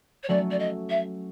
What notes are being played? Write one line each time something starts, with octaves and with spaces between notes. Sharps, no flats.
C#5
F#3 A3 C#4 D5
D5
D#5
E5